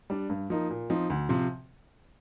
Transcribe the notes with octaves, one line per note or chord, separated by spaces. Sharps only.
G3 D4
G2
F3 A#3 D#4
A#2
F3 C4 D#4
D2
C3 F3